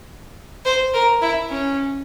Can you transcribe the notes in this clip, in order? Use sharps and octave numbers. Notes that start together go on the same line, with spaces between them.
C5
A#4
E4
C#4